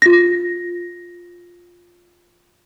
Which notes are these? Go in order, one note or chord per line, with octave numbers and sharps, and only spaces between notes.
F4 A#6